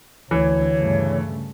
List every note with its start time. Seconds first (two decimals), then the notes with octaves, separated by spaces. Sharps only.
0.31 D2 D3 E3 C#5
0.74 G2 C#3 A3